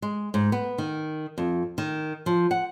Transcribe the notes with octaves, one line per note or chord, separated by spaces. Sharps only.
G#3
G#2
B3
D#3
F2
D#3
F3
F#5